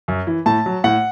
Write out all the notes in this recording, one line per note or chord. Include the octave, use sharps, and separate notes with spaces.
F#2
E3
A2 A5
F#3
A2 F#5